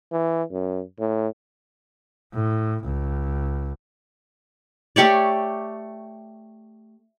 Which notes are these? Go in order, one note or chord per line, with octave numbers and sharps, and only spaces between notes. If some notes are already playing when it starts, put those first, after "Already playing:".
E3
F#2
A2
A2
C#2
A3 G4 C#5 D5